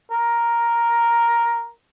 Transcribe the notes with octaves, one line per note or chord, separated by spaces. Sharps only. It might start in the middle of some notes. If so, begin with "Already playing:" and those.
A#4